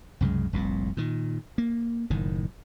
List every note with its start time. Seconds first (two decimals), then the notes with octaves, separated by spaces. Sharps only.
0.21 C2 F#2 C#3 G#3
0.53 F1 C2 A#2
0.97 A#2 D#3
1.58 A#3
2.10 F#1 A2 D#3